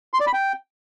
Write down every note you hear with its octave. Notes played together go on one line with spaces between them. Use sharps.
C6
D5
B5
G5